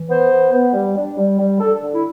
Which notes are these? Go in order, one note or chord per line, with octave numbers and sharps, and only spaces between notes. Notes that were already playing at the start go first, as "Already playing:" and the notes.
Already playing: E3
B3 C5
B3
B3
G3
D4
G3
G3
D4 A4
D3
E4